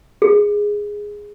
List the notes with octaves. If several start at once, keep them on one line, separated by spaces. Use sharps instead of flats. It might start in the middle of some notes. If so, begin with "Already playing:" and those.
G#4